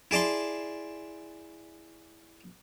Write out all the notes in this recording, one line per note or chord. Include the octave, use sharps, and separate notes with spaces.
E4 G#4 D5 A5 C6